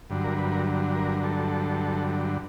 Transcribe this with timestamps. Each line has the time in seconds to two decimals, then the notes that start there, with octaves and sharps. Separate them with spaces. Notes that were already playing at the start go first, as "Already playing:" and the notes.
0.10 G2 D3 F#3
0.24 A#4
0.38 B4
0.52 A#4
0.95 A#4
1.23 A4